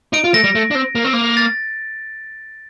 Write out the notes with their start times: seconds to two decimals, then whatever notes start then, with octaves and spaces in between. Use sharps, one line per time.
0.13 D#4 D7
0.24 F4
0.34 A3 A#6
0.44 G3
0.55 A3
0.71 D4
0.75 C4
0.95 A#3
1.04 C4
1.13 A#3
1.37 A6